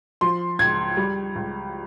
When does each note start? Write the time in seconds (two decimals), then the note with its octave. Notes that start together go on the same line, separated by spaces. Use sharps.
0.21 F3 C6
0.59 C#2 G#6
0.97 G3
1.35 C#2